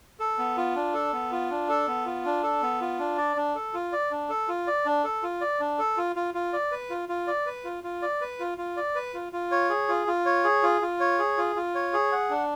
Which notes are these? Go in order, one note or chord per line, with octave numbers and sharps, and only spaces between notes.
A4
B3
F4
D4
A4
B3
F4
D4
A4
B3
F4
D4
A4
B3
F4
D4
D5
D4
A4
F4
D5
D4
A4
F4
D5
D4
A4
F4
D5
D4
A4
F4
F4
F4
D5
B4
F4
F4
D5
B4
F4
F4
D5
B4
F4
F4
D5
B4
F4
F4
C#5
G#4
F4
F4
C#5
G#4
F4
F4
C#5
G#4
F4
F4
C#5
G#4
F#5
D4